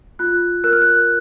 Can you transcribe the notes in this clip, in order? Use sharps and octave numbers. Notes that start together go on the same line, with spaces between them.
F4 F#6
A#4 F#6
F6
F#6